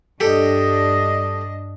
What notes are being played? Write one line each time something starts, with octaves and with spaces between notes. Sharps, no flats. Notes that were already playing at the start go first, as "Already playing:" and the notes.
G2 D4 G4 A4 D#5